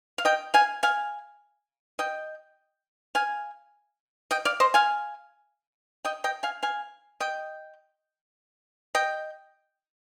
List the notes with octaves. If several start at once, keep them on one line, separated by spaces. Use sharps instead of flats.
F5
D#5 G5
F5 G#5
F5 G#5
D#5 G5
F5 G#5
D#5 G5
D5 F5
C5 D#5
F5 G#5
D#5 G5
D#5 G5
F5 G#5
F5 G#5
D#5 G5
D#5 G5